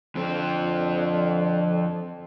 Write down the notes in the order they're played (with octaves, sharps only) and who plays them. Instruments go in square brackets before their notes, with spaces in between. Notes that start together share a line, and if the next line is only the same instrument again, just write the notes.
[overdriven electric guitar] F2 C4 [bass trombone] D3